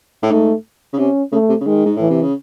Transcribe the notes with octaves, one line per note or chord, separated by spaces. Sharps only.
A2
G#2 A3
C#3
C3 C#4
C#3 A3
C3
C#3
D#3 G#3
G#2
A2 E3
C3
C#3